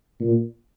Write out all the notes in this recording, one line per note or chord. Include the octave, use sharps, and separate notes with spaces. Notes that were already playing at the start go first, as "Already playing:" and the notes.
A#2